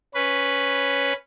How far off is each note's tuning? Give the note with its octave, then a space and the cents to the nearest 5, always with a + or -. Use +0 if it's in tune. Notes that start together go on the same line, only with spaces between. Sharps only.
C#4 +0 B4 +0